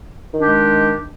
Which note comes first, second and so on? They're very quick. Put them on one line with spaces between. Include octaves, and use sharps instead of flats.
D#3 D4 G4 G#3